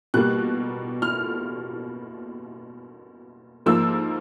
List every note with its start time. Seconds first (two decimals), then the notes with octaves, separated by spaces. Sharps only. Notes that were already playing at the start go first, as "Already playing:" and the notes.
0.14 B2 G3 A#3 F#6
1.02 F6
3.66 G#2 F3 A#3 E6